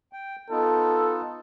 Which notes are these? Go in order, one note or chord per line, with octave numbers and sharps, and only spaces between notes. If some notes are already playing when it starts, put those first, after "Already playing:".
G5
B3 D#4 F4 A4